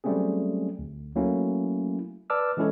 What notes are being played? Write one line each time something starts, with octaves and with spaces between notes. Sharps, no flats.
F#3 G3 A3 C4 C#4 G#4
D2
F#3 A3 A#3 C#4 E4
B4 D5 A5 D6 E6 F6
E3 G#3 C#4 E4 A4 C#5